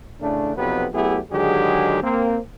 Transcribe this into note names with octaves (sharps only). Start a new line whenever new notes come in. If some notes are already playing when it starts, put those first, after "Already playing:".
A2 C#3 A3 D4
B1 F2 C3 F#3 B3 B4
F#3 A3 B3 E4 G4 G#4
D3 D#3 F#3 G#3 G4 G#4
A#3 C4